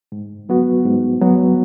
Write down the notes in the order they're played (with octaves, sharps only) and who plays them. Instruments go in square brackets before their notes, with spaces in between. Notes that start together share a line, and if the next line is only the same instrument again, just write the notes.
[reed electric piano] G#2
F#3 B3 F#4
G#2
F#3 B3 F#4